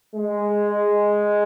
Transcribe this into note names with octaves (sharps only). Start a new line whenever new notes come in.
G#3